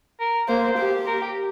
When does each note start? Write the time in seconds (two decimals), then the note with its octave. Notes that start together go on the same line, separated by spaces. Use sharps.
0.20 A#4
0.48 A#3 C5
0.64 C5
0.78 G4
1.07 A#4
1.21 G4